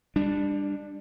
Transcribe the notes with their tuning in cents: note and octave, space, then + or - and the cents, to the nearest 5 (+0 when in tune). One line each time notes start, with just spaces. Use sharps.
G3 +25 D4 +0